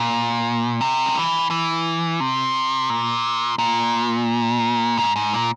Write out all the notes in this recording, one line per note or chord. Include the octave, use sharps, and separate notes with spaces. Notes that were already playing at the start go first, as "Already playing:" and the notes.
Already playing: A#2
C3
C#3
E3
E3
C3
A#2
A#2
G#2
G#2
A#2